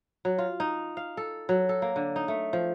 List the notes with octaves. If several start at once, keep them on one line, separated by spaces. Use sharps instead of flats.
F#3
F4
D#4
F5
A4
F#3
A4
A#3
D3
D#4
A3
F3